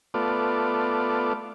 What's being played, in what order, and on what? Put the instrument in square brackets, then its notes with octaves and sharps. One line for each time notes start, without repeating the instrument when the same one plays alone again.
[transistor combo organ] A3 B3 F4 D5